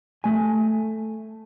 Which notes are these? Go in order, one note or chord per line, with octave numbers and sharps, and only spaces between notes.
A3 G#5